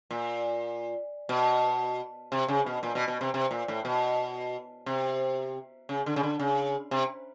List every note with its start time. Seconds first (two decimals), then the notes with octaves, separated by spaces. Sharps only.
0.11 A#2
1.29 B2
2.32 C3
2.48 C#3
2.66 B2
2.83 A#2
2.95 B2
3.08 B2
3.21 C3
3.34 C3
3.51 A#2
3.68 A2
3.85 B2
4.86 C3
5.89 C#3
6.06 D3
6.16 C#3
6.23 D3
6.39 C#3
6.91 C3